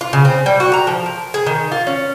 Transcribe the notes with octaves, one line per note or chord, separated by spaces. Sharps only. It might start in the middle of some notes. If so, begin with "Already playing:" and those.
F4
C#3
C4
G3
F#4
A#5
F3
A#4
G#4
D#3
F4
C#4